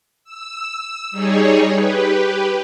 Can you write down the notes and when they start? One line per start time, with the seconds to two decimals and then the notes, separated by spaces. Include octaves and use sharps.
0.24 E6
1.11 G3 D#4 G#4 C#5
1.73 G4 B4